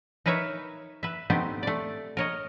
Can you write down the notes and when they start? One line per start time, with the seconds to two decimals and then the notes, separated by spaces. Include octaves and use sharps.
0.26 D#4 A#4 B4 C#5 E5
1.03 B4 E5
1.30 A3 B3 C4 D#4 G4
1.63 A3 D5
2.17 A#4 C#5 D#5